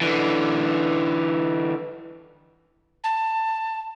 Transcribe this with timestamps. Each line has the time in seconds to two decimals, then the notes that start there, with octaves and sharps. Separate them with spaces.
0.01 D3 E3
3.04 A5